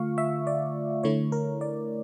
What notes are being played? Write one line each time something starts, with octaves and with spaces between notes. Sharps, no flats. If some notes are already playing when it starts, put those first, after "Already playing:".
Already playing: D3 A3 F4 F5 C#6
E5
D5
D3 A3 E4 C#5
A#4
D5